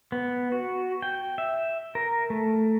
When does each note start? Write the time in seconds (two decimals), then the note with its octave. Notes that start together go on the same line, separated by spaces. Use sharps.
0.12 B3
0.52 F#4
1.02 G5
1.38 E5
1.95 A#4
2.30 A3